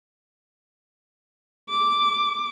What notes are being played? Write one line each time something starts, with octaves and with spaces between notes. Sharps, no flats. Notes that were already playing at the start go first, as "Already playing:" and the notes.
D6